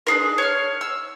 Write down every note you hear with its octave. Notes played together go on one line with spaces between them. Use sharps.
D4 G#4 A#4
C#5 F6
E6